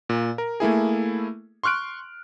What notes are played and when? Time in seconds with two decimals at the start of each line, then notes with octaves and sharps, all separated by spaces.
0.09 A#2
0.38 A#4
0.60 A3 A#3 E4 G#4
1.63 C6 C#6 F6 F#6 D7